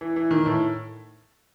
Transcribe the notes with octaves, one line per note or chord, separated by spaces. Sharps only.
E3
E3
D#3
A2